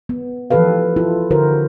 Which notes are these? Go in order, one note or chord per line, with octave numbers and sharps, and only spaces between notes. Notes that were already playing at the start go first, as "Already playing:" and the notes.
B3
E3 F3 G4 A4 B4 F5
E4 F4 A4
D3 E4 F#4 A#4 C5